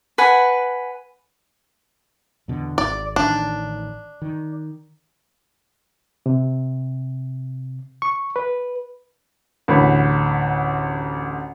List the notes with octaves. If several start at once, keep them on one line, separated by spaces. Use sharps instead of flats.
B4 F#5 G#5
E2 B2 D3
G#1 D5
A1 D#3 D4
D#3
C3
C#6
B4
A1 D2 B5